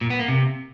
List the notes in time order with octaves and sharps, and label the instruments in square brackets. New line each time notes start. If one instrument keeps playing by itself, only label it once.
[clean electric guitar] A#2
B3
A#3
C3